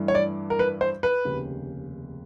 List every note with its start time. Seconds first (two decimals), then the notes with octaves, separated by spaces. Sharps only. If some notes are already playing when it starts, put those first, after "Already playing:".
Already playing: G2 E3 A3 D4
0.08 C#5
0.15 D5
0.50 A#4
0.59 B4
0.81 C5
1.03 B4
1.25 F1 D#2 C#3